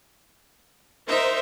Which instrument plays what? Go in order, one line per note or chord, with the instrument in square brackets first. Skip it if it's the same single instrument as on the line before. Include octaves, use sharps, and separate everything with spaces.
[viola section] D#4 C5 [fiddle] A#4 E5